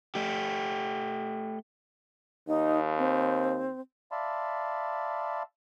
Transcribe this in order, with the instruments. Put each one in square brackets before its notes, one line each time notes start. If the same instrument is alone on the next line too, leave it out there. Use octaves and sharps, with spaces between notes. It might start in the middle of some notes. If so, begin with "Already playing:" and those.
[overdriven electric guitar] A3 G4
[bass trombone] D#2 [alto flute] D#4
[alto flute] C4
[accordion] D5 E5 F5 A5 B5 C6